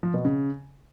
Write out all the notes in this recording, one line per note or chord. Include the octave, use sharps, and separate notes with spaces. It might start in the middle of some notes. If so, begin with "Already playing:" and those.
F3
B2
C#3